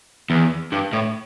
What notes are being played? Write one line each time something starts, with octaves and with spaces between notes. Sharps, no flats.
E2
G2
A2